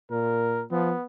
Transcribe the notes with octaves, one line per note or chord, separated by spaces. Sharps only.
A#2 A#4
F3 B3